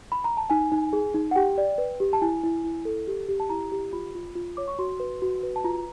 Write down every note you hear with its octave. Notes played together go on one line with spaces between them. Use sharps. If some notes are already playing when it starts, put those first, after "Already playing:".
B5
A#5
A5
D#4 G#5
D#4
G#4
D#4
F#5
G4 G5
D5
B4
G4
A5
E4 G#5
E4
E4
A4
G4
G4
A5
E4 A#5
G4
F4 B5
F4
F4
C#5 D6
C#6
F#4 C6
B4
F#4
B4
A5
F4 A#5